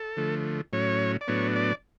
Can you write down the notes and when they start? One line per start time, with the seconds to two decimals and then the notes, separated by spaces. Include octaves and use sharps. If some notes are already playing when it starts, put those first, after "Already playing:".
Already playing: A4
0.17 D3 F3 A3
0.73 A2 F#3 C#4 C#5
1.21 D5
1.28 A2 F#3 B3 D4 C#5
1.56 D5